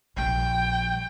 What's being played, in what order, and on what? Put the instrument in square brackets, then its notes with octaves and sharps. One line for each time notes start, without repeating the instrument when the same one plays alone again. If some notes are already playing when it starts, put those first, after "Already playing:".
[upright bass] A#1 G3 [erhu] G5